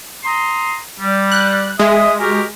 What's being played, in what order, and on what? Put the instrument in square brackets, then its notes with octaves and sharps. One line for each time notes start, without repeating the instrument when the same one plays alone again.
[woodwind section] A#5 C6 D#6
G3
[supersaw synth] F#6
[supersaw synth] G#3 [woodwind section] E5 D#6
[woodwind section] F#4 G4 A#4